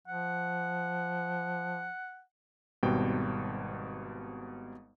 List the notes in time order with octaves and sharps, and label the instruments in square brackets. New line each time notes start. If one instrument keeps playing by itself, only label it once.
[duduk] F3 [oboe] F#5
[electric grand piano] G#1 B2 G3 C4 G5